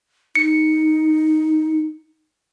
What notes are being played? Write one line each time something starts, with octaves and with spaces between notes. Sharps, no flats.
D#4 C#7